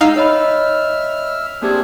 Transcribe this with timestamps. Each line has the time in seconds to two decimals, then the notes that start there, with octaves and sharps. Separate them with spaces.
0.01 G#3 D#4 F5 E6
0.16 C#5 D#5 E5 B5 F6
1.62 A#3 C4 D4 G4 G#4 G#6